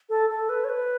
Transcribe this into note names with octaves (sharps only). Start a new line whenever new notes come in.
A4
A4
B4
C#5
B4